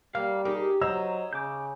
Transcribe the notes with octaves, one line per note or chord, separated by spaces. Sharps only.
G3 A#3 F5 F6
D#4 G4 G#4 A#4
F#3 D#4 C5 C#5 D#5 E6
C#3 D6 G6